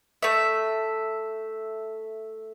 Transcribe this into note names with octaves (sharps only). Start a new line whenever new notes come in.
A3 E5